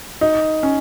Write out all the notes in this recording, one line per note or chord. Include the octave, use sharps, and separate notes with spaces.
D#4
C#4